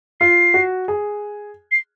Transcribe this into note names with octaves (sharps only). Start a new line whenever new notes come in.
F4 C7
F#4
G#4
C7